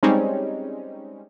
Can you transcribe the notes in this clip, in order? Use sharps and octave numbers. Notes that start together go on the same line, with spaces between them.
G3 G#3 C4 C#4 D#4